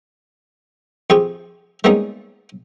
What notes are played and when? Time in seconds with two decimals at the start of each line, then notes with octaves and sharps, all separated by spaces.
1.10 F2 G4 G#4 C#6
1.84 G3 G#3 A#3 B3 C#4 D#4